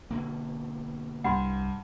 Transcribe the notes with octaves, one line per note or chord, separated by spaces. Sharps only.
B2 D3 A#3
C2 G2 F#5 B5 C6